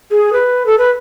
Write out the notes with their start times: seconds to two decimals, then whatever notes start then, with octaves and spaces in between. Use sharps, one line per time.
0.11 G#4
0.33 B4
0.66 A4
0.78 B4